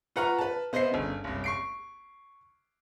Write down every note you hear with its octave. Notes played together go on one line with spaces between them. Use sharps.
F4 B4 F#5 A#5 C#6 F6
B4 A5
B3 C5 D#5 E5 C7
G1 C#3
F#1 C2
C#6 C7 D7